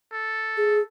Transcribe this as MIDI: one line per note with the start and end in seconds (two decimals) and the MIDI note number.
0.12 0.85 69
0.57 0.81 68